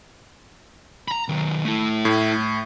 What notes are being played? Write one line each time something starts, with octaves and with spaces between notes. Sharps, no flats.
A#5 B5
D#3 F#3
A3 E4
A2